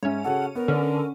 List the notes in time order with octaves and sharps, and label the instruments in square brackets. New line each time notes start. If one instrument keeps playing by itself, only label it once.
[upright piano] G#2 E5 [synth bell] C#4 C#5
[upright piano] C#3 F#4 A4 [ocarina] F#5
[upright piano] B3 [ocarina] A#4
[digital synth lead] D3 [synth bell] C#4 [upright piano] B4 D5